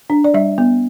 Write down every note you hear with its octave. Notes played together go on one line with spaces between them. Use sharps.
D4
D5
G3 E5
B3